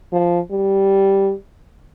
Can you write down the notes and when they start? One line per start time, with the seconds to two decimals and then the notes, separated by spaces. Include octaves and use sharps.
0.13 F3
0.51 G3